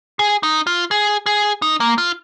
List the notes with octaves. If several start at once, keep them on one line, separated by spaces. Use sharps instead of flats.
G#4
D#4
F4
G#4
G#4
D#4
A#3
F4